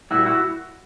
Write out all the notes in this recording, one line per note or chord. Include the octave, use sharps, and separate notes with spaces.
A#2 G3 E4 F#4
E4 F#4